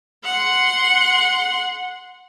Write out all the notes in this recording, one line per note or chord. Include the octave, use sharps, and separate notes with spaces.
F#5 C6